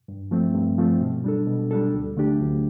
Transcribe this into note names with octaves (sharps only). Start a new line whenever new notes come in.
G2
F3 A3 C4
G2
F3 A3 C4
B2
G3 D4 A4
B2
G3 D4 A4
D2
D3 A3 D4 G4
D2